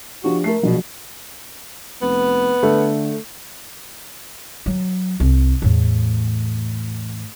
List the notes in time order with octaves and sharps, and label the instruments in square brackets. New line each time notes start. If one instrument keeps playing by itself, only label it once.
[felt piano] F3 D4 G4 [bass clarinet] F#4
[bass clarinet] A3 [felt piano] A#4 C7
[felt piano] A#1 F#3 [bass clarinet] B2
[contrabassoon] F1 [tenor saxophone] B3
[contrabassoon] D3 [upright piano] A3
[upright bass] F#3
C2
E2 A2